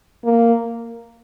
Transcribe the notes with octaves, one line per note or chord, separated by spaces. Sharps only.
A#3